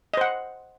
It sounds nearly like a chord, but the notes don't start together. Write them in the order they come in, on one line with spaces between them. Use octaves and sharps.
D#5 C5 F#5